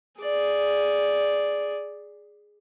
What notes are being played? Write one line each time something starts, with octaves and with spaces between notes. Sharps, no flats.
G#4 D5